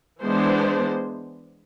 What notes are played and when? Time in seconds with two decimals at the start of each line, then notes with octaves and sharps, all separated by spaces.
0.21 E3 G#3 B3 D4 C5